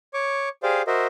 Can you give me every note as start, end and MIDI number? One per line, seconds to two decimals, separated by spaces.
0.14 0.49 73
0.14 0.49 85
0.14 0.49 86
0.63 0.82 67
0.63 0.82 68
0.63 0.82 72
0.63 0.82 74
0.63 0.82 77
0.87 1.07 66
0.87 1.07 70
0.87 1.07 72
0.87 1.07 75
0.87 1.07 76